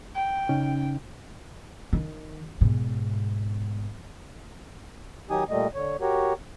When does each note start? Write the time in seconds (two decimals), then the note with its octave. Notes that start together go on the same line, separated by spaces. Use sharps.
0.15 G5
0.49 C#3 C#4 D#4
1.93 D#3
2.61 G#2 B2
5.30 D#3 F#3 D#4 G4 G#5 D#6
5.50 A#2 G3 A3 D#5
5.75 D3 C#5
6.01 F#4 G4 A#4 C#5